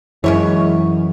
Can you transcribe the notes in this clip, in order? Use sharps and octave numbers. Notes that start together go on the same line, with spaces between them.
F#2 E3 G#3 C#4 E4 C#5